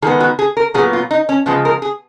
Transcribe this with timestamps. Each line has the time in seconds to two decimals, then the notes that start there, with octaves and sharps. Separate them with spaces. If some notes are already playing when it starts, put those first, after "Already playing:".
0.02 D#3 G#3 B3 G#4
0.20 F#4
0.39 G#4
0.57 A#4
0.74 A#2 F#3 B3 G#4
0.93 F4
1.11 D#4
1.29 C#4
1.46 C#3 F3 G#3 B3
1.65 A#4
1.82 G#4